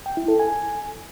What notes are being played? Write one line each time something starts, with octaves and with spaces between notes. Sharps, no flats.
G5
E4
A4
G#5